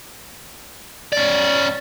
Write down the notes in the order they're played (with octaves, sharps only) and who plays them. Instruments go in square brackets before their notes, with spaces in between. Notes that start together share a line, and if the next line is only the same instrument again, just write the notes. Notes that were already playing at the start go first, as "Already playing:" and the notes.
[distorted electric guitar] C#4 D5